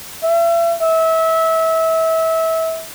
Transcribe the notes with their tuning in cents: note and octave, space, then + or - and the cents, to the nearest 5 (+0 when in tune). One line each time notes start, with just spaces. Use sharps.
E5 +40
E5 -25